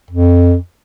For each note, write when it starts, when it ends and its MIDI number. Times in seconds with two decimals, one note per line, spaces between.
0.11 0.56 41